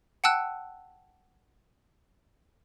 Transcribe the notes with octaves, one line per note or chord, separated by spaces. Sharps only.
F#5 G5 A5 E6 F#6